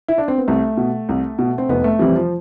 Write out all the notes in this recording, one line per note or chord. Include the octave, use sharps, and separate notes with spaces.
E4
D4
C4
B3
C2 A3
B2
C2
B2
C4
F1 B3
A3
F2 C3 E3 G3
F3